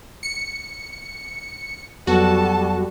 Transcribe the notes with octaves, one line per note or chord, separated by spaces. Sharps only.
C#7
F2 F#3 G3 B3 F#4 A4 A5